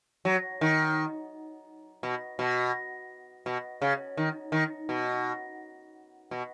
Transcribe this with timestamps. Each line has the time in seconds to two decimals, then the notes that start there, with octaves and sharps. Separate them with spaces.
0.25 F#3
0.61 D#3
2.03 B2
2.39 B2
3.46 B2
3.82 C#3
4.17 D#3
4.52 D#3
4.89 B2
6.31 B2